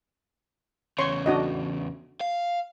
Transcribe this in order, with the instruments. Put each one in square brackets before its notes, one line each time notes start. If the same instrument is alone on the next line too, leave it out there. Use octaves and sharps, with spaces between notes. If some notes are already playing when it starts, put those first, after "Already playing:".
[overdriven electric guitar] E2 C#3 [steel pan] C#5 C6 C#6
[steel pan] D4 F#4 D#5
[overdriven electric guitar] F5